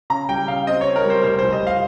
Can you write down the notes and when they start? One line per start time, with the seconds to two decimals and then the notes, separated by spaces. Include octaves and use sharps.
0.10 C#3 A#5
0.29 G3 G5
0.48 C#3 F5
0.67 C4 D#5
0.81 C#5
0.86 C4
0.96 A#4
1.05 G3
1.10 C5
1.24 F1 C5
1.39 C5
1.43 F1
1.52 D#5
1.62 F1 F5